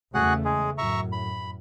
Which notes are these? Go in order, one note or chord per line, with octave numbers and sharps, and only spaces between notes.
E2 C#3 A3 F#4 G#4 F#5
G#3 G#4
F#2 A2 E5 A#5 C#6
B5